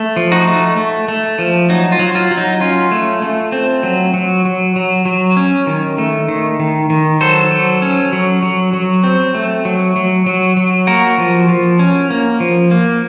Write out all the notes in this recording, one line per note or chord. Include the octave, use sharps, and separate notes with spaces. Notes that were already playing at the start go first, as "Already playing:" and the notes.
Already playing: A3
F3
D#4 F#4
A3
A3
A3
F3
F#3 D#4
F4
F#3
F4
F#3
D#4
C#4 F4
A3
A3
C4
F#3
F#3
F#3
F#3
F#3
C#4
D#3
A3
D#3
D#3
D#3
F#3 A4 C5
F#3
C#4
F#3
F#3
F#3
C4
A3
F#3
F#3
F#3
F#3
A#3 F#4 A#4
F3
F3
C#4
A#3
F3
A#3